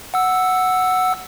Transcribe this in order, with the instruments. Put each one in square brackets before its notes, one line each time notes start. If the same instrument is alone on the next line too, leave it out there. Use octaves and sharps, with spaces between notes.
[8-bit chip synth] F#5 E6